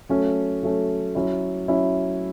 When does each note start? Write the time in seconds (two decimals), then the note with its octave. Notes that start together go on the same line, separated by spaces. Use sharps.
0.09 F#3 A3 C#4
0.63 F#3 A3 C#4
1.15 F#3 C#4 E4
1.68 F#3 C#4 E4